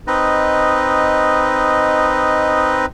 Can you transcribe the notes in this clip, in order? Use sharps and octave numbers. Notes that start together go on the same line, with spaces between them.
C4 D#4 B4 D#5